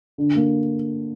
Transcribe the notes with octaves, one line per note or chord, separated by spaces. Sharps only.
D3
A#3